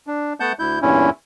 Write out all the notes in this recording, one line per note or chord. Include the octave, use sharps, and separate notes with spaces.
D4
A3 B3 F#5 A5 G6
D2 E4 G6
E2 G2 A#2 C#4 E4